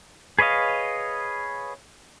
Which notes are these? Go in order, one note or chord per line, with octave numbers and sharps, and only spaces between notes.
G#4 B4 C#5 D#5 F5